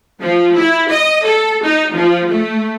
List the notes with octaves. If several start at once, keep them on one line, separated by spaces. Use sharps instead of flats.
F3
E4
D#5
A4
D#4
F3
A3